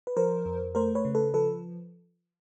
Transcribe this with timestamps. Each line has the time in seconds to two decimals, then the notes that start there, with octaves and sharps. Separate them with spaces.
0.07 B4
0.17 F3 A#4 C5
0.46 F2
0.75 A3 A#4 C5
0.95 B4 C#5
1.05 C#3
1.15 A4 B4
1.34 F3 A4 B4